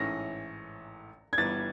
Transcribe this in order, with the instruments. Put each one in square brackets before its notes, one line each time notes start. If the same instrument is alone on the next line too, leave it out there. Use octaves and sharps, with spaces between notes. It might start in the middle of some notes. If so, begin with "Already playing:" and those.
Already playing: [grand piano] A1 G#2 E3 A3 C#4 [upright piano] A#6
[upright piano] G#6
[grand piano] G1 G2 E3 G3 B3 [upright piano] A6